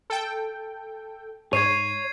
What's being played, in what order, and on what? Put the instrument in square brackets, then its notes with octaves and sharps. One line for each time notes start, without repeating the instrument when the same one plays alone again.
[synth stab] A4 G5
[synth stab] G#2 [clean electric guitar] C#5 [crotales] G#6 C7 D#7